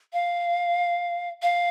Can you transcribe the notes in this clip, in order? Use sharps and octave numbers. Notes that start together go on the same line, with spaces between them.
F5
F5